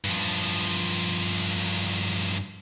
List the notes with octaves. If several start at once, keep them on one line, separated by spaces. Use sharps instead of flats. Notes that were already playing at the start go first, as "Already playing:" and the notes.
G2 F3